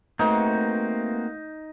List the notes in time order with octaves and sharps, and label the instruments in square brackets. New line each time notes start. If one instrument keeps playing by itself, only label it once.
[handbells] A3 B4 G#6 [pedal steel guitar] A#3 C4 F#4 [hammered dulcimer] D#4